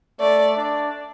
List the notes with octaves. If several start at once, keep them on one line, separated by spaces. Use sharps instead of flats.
A3 D5
D4